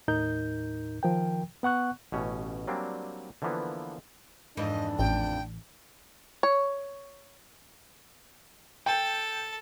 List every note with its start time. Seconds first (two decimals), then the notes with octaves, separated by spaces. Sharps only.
0.08 D#2 A2 D#4 A#4 G6
1.03 D#3 F3 A#4 G5
1.63 B3 F#5 C#6 F#6
2.12 A1 B2 C#4
2.67 F#3 G3 A#3 C4 D4
3.42 D3 E3 F3 A#3 B3
4.57 F2 G#2 E3 D4 D#5
4.98 A1 G5
6.43 C#5
8.86 A4 G5